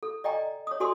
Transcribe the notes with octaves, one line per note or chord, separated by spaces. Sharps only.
A4
D5 D#5 G5 G#5 A#5
C#5 D#6
F#4 A4 D5 G#5 C6 D#6